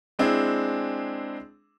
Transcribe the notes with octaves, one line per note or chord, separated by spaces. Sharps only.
G#3 C4 D4 E4 G#4